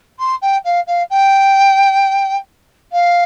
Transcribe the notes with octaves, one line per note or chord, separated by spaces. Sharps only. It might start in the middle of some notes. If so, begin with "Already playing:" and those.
C6
G5
F5
F5
G5
F5